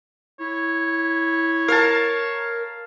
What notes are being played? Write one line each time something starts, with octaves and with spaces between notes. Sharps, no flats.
E4 C#5
A#4 F5 A5